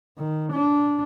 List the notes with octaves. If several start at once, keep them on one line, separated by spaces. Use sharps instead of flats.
D#3
D4